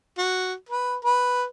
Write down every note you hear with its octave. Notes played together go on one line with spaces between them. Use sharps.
F#4
B4
B4